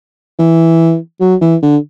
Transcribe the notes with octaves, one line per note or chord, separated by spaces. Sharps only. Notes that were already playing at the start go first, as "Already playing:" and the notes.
E3
F#3
E3
D3